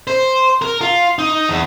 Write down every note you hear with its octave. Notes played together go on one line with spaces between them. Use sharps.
C5
A#4
F4
D#4
E2